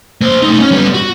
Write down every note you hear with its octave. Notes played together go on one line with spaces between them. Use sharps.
A#3 C5
A3 D#4
C#4
G3 B3
F#4